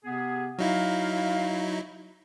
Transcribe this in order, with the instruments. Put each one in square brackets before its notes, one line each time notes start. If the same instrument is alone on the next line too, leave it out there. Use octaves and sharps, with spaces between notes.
[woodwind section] C3 B3 G#4
[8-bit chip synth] F#3 D#4 E4 [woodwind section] F5